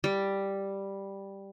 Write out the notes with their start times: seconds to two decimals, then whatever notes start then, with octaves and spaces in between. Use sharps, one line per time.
0.04 G3